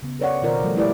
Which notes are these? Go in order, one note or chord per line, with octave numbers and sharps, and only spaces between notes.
C#3 B3
A4 B4 C#5 D5 F#5
B2 D#3 F4 A#4 C5 D5
F3 G3 A3 A4
G#3 A3 E4 G4 B4 D5